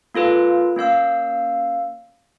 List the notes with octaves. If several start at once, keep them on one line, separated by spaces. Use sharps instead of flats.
A#3 F4 A4 B4
A#3 C#4 F5 E6